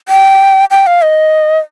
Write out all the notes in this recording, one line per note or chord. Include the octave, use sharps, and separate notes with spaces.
G5
G5
F5
D#5